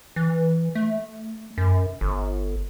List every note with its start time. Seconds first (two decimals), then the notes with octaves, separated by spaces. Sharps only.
0.16 E3
0.75 A3
1.58 F#2
2.01 G1